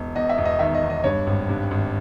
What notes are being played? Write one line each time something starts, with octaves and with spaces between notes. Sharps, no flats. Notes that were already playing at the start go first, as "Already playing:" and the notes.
Already playing: E1
E2 D#5
E5
E1
D#5
D#3 E5
D#5
E2
D#5
G2 C#5
G#1
G2
G#1